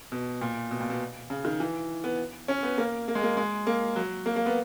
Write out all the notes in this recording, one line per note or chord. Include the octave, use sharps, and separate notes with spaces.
B2
A#2
B2
A#2
B2
C#3
D#3
E3
B3
C#4
B3
A#3
A#3
G#3
A#3
G#3
A#3
F#3
A#3
A#3
B3